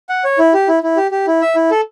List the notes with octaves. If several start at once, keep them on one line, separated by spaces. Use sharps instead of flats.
F#5
C#5
E4
G4
E4
E4
G4
G4
E4
E5
E4
A4